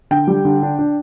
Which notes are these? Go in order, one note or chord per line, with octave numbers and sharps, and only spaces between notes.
D3 G5
G3
D3
D4
D4